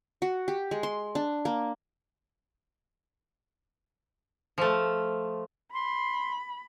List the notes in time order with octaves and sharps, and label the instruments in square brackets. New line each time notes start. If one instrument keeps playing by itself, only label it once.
[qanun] F#4
G4
G#3
C6
D4
A#3
[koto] F3 A3
[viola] B5 [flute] C6